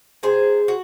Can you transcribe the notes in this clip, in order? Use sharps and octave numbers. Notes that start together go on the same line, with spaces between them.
C3 G#4 C5
F#4